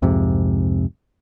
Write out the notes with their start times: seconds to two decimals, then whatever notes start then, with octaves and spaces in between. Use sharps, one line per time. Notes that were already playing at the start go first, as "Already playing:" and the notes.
0.02 C2 F2 G#2 C3